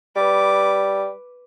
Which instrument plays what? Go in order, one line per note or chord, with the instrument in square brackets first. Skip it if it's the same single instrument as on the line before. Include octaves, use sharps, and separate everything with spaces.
[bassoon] G3 [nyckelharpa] B4 D6